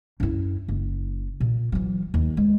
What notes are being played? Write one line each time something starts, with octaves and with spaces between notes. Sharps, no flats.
F#2 E4
F#1
A#2
E3 F#3
D#2
G#3